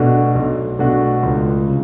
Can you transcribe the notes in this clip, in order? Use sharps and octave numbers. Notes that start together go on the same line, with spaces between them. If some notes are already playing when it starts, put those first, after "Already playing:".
Already playing: B2 A3 D4 F#4
B1
B2 A3 D4 F#4
C#2
C#3